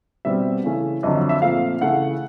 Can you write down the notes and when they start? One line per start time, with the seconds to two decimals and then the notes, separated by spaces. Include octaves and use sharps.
0.25 B2 G3 C4 E5
0.63 C#3 E3 A3 C#4
1.03 F2 D3 F#3 D#5
1.15 E5
1.29 E5
1.42 A#2 F3 A3 C4 F5
1.81 C#3 E3 A3 F#5